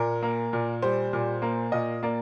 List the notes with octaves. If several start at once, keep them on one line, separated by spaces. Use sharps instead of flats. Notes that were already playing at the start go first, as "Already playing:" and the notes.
Already playing: A#2 A#4
A#3
A#2
G3 C5
A#2
A#3
A#2 D#5
A#3 D5